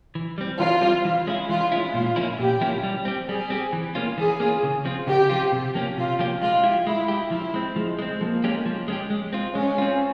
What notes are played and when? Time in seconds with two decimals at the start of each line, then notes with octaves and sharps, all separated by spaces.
0.15 E3
0.38 G3 C4
0.59 E3 F4
0.82 G3 C4
1.05 E3
1.27 G#3 C#4 E4
1.49 E3 F4
1.72 G#3 C#4 E4
1.94 A#2 F4
2.16 F3 A#3 C#4 E4
2.39 A#2 G4
2.61 F3 A#3 C#4 E4
2.83 G3
3.05 C4 G4
3.28 G3 G#4
3.50 C4 G4
3.73 E3
3.95 A#3 C#4 F4
4.17 E3 G#4
4.40 A#3 C#4 F4
4.63 C#3
4.85 F3 C4 F4
5.07 C#3 G4
5.30 F3 C4 F4
5.52 C3
5.75 F3 A#3 C#4 G4
5.97 C3 F4
6.19 F3 A#3 C#4 G4
6.42 G#3 F4
6.64 E4 G4
6.87 G#3 E4
7.08 E4 G4
7.31 F3 E4
7.54 G#3 C4
7.76 F3 G#3
7.99 G#3 C4
8.21 F3 A#3
8.44 G#3 C#4 G4
8.66 F3
8.88 G#3 C#4 G4
9.10 G#3
9.33 C4 F4
9.55 G#3 C#4
9.78 C4 F4